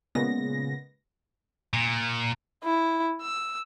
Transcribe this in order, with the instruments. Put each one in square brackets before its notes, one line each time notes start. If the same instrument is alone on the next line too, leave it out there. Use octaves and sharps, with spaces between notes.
[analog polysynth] A#2 C#3 G#3 B3 A#6
[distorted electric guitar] A#2
[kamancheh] E4
E6